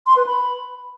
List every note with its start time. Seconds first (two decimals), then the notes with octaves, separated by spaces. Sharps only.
0.06 C6
0.16 B4
0.27 B5